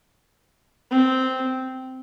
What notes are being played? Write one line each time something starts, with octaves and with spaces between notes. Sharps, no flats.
C4